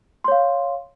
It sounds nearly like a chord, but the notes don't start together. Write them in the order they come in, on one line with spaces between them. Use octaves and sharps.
C6 C#5 F5